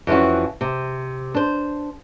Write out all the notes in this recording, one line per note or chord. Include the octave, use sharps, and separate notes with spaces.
F2 E3 C#4 F#4
C3
D4 C5